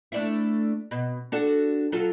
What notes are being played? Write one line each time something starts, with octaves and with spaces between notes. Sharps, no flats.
A3 D4 E4
B2
D4 F#4 A4
F#3 F4 A4